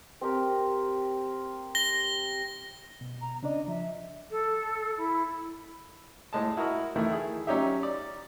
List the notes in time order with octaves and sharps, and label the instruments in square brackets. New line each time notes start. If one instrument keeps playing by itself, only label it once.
[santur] C4 G4 A#4
[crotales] A#6 G7
[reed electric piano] B2
[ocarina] A#5
[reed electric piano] C#3 D4 D5 [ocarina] D#5
[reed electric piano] F3 [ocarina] E5
[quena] A4
E4
[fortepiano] A2 G#3 A5
E4 F#4 A#4 D#5
D#3 E3 A3 E4
G#4
F#3 C#4 D#4 G4 E5
D5